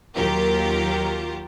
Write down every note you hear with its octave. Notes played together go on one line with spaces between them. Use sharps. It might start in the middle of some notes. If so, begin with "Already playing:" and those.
D#2 F#3 F4 G4 A#4